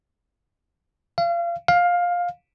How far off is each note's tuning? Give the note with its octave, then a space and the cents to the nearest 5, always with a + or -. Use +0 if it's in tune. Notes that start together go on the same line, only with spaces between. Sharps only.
F5 -30
F5 +15